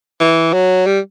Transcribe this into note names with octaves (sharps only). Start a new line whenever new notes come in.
E3
F#3
G3